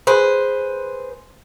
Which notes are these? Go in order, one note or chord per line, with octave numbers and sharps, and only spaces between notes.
G#4 B4 C5